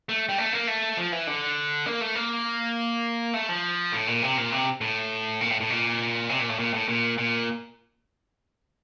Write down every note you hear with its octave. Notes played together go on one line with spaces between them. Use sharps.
A3
G3
A3
A#3
A3
F3
E3
D3
A#3
A3
A#3
A3
F3
A2
A#2
C3
A#2
C3
A2
A#2
A2
A2
A#2
C3
A#2
A2
A#2
A2
A#2
A#2